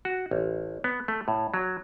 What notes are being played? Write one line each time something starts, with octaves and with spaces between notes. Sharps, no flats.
F#4
A1
B3
A3
A2
F#3